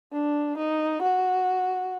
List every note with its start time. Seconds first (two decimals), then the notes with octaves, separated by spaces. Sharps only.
0.12 D4
0.57 D#4
1.02 F#4